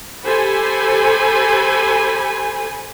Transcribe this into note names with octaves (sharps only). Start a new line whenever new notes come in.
G4 A4 C5 G#5 B5